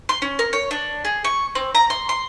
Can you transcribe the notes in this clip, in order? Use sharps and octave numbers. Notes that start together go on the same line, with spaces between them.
C6
C#4
A#4
C#5
D4
G#4
C#6
C4
A#5
C6
C6